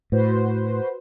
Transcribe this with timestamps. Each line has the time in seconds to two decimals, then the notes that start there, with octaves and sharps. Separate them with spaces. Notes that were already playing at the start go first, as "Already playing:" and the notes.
0.12 A2 F#4 B4 C5